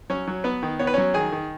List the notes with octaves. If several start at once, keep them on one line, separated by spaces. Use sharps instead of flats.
F#3 C#4 C#5
F#3
B3 B4
D#3
B3 C#5
B4
F#3 C#4 C#5
D#3 G#4 G#5
D#3